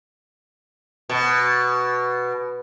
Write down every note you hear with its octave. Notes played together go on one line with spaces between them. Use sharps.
B2